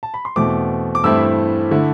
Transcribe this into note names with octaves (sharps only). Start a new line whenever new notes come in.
A5
B5
C6
E2 B2 A3 C4 D6
D6
G2 E3 A3 C4 E4 E6
D3 A3 E4